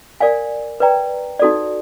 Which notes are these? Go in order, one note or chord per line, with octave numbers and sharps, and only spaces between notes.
A#4 D5 F5 G#5
B4 D5 G5 A#5
D#4 F#4 A4 D5